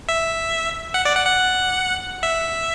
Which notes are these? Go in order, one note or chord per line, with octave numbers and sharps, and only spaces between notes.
E5
F#5
D5
F#5
F#5
E5